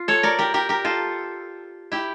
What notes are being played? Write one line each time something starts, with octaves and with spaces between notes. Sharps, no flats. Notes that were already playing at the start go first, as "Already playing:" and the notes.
Already playing: F4
A4 C#5
A#4 D5
G4 A#4
G4 A#4
G4 A#4
F4 A4
E4 G4